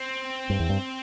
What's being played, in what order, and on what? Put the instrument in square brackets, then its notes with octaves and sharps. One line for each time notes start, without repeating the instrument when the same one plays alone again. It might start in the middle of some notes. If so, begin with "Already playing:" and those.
Already playing: [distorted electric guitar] C4
[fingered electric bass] G2
E2
G2